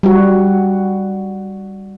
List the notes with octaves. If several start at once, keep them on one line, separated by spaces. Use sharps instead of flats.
G3 F#4